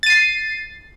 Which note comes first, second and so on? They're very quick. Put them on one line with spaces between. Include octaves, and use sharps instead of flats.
A6 D#7 C7